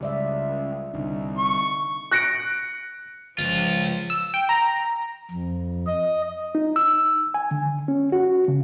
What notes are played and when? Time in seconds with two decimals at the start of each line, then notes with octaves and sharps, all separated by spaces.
0.01 C#2 G3 D5 E5
0.94 C2 D3 D#4
1.37 C#6
2.11 F#6 A#6 C#7 D7
3.39 G1 C#2 F3 F4
4.10 E6
4.34 G5
4.49 A#5
5.31 F2
5.87 D#5
6.55 D#4
6.76 E6
7.34 G#5
7.51 D3
7.88 C#4
8.12 F#4
8.48 C#3